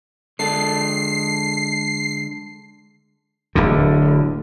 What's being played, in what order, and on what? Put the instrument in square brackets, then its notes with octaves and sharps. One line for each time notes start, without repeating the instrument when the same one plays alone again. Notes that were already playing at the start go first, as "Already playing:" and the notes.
[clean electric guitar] D3 G#3 A4 [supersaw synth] C7
[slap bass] D1 D2 D3